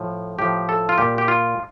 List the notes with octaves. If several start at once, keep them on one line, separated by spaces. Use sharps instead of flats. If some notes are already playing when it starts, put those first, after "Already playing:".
Already playing: A2 F3
A2 F3 G4
A4
F4
A#2 G3 G4
G4
F4